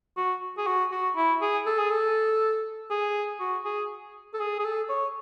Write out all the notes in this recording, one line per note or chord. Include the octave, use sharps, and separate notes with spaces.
F#4
G#4
F#4
F#4
E4
G#4
A4
G#4
A4
G#4
F#4
G#4
A4
G#4
G#4
A4
C#5